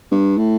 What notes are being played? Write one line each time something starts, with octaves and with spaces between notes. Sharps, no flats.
G2
A2